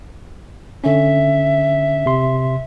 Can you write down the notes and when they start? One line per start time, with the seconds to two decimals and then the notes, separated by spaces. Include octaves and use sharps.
0.84 D3 C#4 E5
2.06 C3 C6